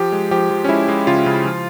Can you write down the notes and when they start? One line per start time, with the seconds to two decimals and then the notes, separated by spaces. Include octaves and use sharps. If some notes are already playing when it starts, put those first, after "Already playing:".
Already playing: F3 G4
0.12 G#3
0.31 F3 G4
0.51 F3
0.64 C#4
0.69 G#3 E4
0.88 G#3
1.07 C#3 F4
1.26 C#3
1.45 F3